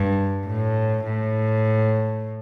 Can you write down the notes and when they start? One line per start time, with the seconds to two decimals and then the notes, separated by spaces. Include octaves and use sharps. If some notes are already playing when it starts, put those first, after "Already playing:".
Already playing: G2
0.47 A2
1.05 A2